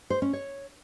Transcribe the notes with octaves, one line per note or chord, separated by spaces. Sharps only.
C5
C#4
C#5